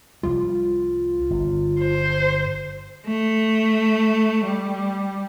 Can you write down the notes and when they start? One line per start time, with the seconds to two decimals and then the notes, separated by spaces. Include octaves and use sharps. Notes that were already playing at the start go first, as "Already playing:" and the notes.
0.23 C2 F3 G3 F4
1.30 G1
1.81 C5
3.06 A3
4.44 G3